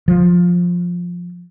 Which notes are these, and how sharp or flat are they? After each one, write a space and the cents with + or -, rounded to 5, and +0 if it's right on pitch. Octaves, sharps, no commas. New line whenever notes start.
F3 +10